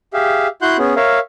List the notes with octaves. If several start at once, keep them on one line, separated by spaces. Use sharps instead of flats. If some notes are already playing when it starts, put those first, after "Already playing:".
G4 G#4 E5 F5
E4 F#4 F#5 C6 F#6 G6
B3 C#4 G#4
A#4 C#5 E5 F5